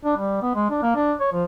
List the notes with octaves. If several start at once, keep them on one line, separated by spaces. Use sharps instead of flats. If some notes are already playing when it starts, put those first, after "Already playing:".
D4
G3
B3
G#3
D4
A#3
D4
C#5
F3